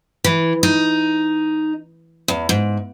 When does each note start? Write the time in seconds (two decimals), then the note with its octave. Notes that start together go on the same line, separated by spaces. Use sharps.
0.24 E3
0.63 D#4
2.28 E2
2.49 G#2